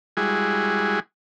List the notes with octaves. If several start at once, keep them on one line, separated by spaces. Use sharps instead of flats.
G3 G#3 E4 F#4 G#4